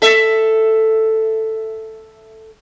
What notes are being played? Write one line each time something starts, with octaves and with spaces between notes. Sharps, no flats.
A4 E5